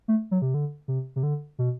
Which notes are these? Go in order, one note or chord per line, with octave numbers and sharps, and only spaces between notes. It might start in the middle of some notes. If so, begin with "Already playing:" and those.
A3
F#3
C3
D3
C3
C3
D3
B2